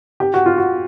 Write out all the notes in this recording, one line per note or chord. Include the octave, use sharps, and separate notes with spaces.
G4
F#4
F4
F#4